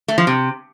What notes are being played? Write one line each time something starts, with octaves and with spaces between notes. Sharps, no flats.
A3
F3
C3